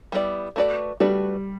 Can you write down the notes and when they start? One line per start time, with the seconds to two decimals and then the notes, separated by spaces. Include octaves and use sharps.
0.12 G3 B3 E4 A4 D5
0.56 A3 D4 F#4 B4 D5
1.00 G3 A3 D4 F#4 B4 D5